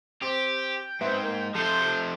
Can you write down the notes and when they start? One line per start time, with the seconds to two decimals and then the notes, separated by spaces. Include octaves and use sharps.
0.22 C4 G4
0.56 G5
1.01 G#2 B3 C4 E5
1.24 A#3
1.55 C3 F3 A4 C5
1.81 A4